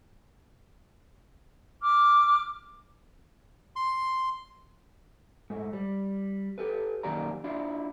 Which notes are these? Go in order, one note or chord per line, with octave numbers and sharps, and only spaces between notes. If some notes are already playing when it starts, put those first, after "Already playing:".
D6 F6
C6
G#2 A3
G3
G4 A4 B4
F#2 D#3 A#3 G4 D5 A#5
D4 E4 F4 D5